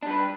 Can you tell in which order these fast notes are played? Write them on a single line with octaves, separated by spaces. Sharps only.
D4 G3 B4